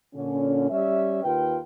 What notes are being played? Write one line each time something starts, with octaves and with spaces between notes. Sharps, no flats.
A#2 D3 C#4
G3 C#4 D5 E5
D#2 F4 A#4 B4 G5